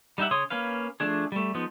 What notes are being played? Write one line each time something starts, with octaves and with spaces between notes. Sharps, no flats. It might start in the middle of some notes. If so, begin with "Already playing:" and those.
G3 D#4 G4 E5 F#5
C#3 C#5 C6 D#6
A#3 C#4 B4 F5
F3 A3 D4 G#4
G3 A3
F3 G#3 B3 D#4